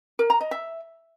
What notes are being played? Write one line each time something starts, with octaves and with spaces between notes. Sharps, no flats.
A#4
A#5
D#5
E5